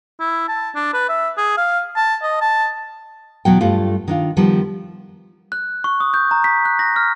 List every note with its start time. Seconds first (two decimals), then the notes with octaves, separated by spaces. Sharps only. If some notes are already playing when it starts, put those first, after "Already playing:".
0.20 E4
0.48 A5
0.75 D4
0.94 B4
1.09 E5
1.38 G#4
1.58 F5
1.96 A5
2.23 D#5
2.41 A5
3.45 E2 B2 F#3 G5
3.61 G2 G3 A3 F4
4.08 D#3 D4 F4
4.37 D#3 F3 G3 B3
5.52 F#6
5.84 C#6
6.00 D#6
6.14 G6
6.31 A#5
6.44 B6
6.65 F#6
6.79 A#6
6.96 F6